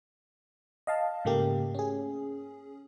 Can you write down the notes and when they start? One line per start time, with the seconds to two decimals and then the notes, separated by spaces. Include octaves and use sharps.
0.87 D#5 F5 A5
1.25 G#2 C#3 A3 A#3 G4
1.75 C#4 G#4